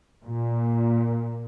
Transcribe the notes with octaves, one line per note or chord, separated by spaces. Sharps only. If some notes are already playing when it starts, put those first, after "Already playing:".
A#2